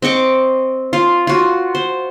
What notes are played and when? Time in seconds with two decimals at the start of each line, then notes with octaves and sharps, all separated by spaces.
0.02 C4 D#5 C#6 D6
0.93 F4
1.27 F4 F#4
1.75 C5